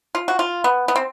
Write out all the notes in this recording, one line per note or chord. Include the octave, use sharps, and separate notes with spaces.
F4
F#4
F4
B3
B3
C4